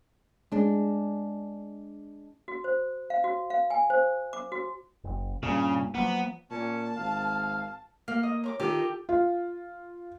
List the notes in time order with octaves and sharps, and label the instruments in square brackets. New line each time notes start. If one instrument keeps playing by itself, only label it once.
[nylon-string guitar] G#3 D4
[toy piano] F#4
C5
F5
F#4
F5
G#5
C5
D6
F#4
[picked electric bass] F#1
[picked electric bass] G2 A#2 [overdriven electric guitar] C#3
[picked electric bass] F3 F#3 A#3 [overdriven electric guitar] B3
[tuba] A#2 [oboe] C#4 [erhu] A5
[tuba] G#1 [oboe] F5
[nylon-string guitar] A#3 [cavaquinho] F5
[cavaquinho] D#5
[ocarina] C#5 [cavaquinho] A#5 C#6 D6
[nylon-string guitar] D#3 [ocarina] F4 [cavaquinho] G4 A4 D6
[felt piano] F4